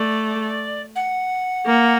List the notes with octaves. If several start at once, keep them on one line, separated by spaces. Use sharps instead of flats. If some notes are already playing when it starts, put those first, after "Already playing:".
Already playing: A3 D5
F#5
A#3